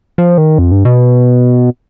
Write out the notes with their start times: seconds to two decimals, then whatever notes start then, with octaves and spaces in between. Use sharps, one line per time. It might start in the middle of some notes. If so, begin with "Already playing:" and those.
0.18 F3
0.38 D#3
0.58 F2
0.72 G2
0.85 B2